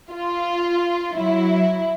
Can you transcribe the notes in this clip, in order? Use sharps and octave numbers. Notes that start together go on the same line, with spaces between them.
F4
F#3 E4